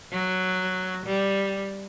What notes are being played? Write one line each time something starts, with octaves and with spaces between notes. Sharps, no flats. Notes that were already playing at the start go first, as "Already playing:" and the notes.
F#3
G3